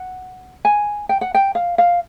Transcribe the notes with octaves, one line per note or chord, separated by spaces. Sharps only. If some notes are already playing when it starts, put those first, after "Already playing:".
Already playing: F#5
G#5
G5
F#5
G5
F5
F5